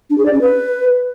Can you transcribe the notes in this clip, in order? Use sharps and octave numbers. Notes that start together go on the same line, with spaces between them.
D4
G#4
D5
C#4
B4